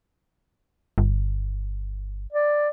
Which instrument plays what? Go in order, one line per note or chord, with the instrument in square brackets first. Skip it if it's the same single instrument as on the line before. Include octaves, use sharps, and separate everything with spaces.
[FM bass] G1
[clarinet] D5